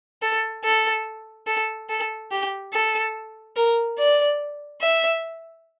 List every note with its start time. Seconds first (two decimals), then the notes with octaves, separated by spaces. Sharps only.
0.22 A4
0.64 A4
1.47 A4
1.89 A4
2.31 G4
2.73 A4
3.56 A#4
3.99 D5
4.82 E5